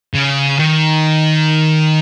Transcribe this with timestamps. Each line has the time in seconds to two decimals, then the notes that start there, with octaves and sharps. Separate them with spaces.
0.14 C#3
0.59 D#3